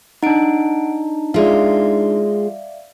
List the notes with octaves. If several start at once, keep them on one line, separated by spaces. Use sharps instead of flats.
D4 D#4 F#5 D7
G#3 F4 D5 E5 F5